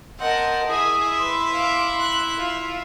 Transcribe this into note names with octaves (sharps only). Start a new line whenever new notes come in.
C4 A#4 D#5 F#5 A5
E4 G#4 E5 G#5 D#6
B4 C6
F5 D6
F#6
F4